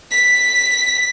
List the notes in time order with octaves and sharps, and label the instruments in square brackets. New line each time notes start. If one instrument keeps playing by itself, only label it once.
[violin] B6